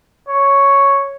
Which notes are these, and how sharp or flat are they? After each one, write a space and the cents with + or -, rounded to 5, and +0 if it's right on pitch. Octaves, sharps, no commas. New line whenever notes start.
C#5 +0